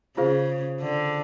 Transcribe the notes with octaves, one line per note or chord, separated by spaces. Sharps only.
C#3 F4 G#4 C5 F5
D3